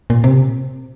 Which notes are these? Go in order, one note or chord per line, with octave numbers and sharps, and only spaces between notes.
A#2
C3